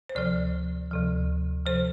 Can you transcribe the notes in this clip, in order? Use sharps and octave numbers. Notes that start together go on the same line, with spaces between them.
C5
D2 C3 F3 D5
D2 C3 F3
C3 F3 C5